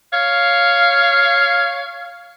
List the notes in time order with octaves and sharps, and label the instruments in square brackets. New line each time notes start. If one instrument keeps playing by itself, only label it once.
[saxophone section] C#5 F5